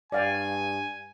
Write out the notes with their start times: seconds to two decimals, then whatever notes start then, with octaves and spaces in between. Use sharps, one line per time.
0.12 G2 D5 F5 G5 G#5